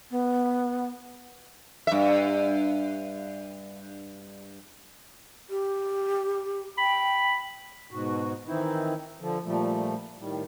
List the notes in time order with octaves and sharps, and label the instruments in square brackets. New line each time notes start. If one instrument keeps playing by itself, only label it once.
[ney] B3
[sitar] G2 E5
[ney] G4
[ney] G5 [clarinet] B5
[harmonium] G#2 B2 F#4
D#3 E3 C4 D#4 E4
D3 F3
A#2 F3 G3 A3
A2 D#3 G3